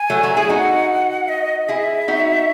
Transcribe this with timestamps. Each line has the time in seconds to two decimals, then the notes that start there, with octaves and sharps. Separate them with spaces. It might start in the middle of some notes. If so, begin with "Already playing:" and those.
Already playing: G#5
0.10 F#3 A3
0.23 F#3 A3
0.36 E4 G#4
0.49 D#4 F#4 F#5
1.28 D#5
1.68 E4 G#4 E5
2.08 D#4 F#4